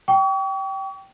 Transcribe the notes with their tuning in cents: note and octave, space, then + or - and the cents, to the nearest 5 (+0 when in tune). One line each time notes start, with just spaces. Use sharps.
G5 -15 C#6 +40